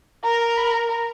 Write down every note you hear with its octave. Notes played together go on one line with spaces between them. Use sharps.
A#4 A#5
A#5
B5
A#5
A#5